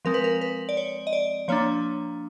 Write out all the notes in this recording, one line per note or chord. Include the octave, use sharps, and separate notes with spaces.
F3 G#3 C4 A#4
B4
A#4
B4
D5
C#5
D#5
D5
F3 A#3 D4 C#5